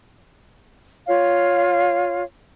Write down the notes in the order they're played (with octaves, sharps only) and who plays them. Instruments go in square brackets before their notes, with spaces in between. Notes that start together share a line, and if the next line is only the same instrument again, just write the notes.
[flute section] F4 C#5 F5